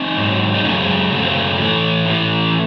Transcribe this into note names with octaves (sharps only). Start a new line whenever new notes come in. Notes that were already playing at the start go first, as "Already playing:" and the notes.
Already playing: C4 D#4
G#2 F#3
D#4
F#2 C#3 F#3 A3 C#4
G#3 C4
G#3
F#2 C#3 F#3 A3
C4
A3
A2 E3
A2 E3